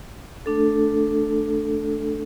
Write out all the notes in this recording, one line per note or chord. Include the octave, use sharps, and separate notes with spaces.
A3 D4 A4